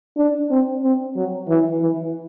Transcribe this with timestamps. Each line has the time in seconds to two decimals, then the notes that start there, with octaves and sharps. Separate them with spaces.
0.17 D4
0.51 C4
0.83 C4
1.16 F#3
1.48 E3
1.80 E3